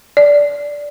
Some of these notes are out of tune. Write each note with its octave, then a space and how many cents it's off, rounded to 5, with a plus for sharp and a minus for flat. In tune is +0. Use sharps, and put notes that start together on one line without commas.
D5 -10